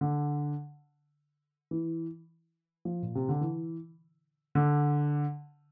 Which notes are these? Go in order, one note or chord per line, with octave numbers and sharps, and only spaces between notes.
D3
E3
F3
A#2
C3
D3
E3
D3